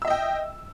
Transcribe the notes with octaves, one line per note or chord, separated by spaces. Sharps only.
D#5 E5 G5 E6